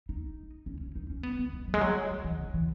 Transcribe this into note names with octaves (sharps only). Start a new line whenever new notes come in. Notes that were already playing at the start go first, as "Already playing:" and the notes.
D#4
C#4
C#4
D#4
C#4
B3
B3
G#3
F#3
G#3
F#3
F#3
E3
C#3
E3